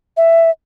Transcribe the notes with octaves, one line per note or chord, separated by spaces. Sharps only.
E5